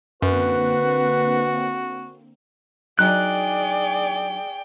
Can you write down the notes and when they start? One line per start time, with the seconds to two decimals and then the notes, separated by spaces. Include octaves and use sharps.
0.22 F#2 D3 A#3 C4 F#4 B4
2.99 F#3 D4 D#4 G#4 D5 G5 F#6